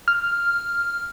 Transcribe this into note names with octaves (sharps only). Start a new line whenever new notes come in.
F6